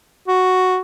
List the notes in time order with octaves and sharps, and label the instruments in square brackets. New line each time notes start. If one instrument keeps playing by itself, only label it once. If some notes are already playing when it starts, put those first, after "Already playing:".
[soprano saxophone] F#4